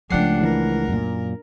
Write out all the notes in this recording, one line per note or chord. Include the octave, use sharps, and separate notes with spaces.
C#2 F3 A3 D4 G4 F#5 C7
E3 A#4
F#2 A#2